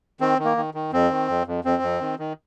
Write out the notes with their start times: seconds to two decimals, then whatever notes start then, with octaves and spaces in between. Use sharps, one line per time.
0.20 D#3 C4
0.39 D#3
0.45 A#3
0.57 D#3
0.74 D#3
0.93 F2 C4
1.11 D#3
1.28 F2
1.47 F2
1.64 F2 C4
1.82 F2
2.01 D#3
2.19 D#3